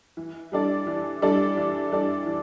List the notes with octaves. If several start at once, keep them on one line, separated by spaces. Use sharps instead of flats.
E3
G3 D4 A4 D5
E3
G3 D4 A4 D5
E3
G3 D4 A4 D5
E3